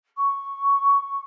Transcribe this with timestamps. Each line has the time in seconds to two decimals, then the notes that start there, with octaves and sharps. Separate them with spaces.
0.16 C#6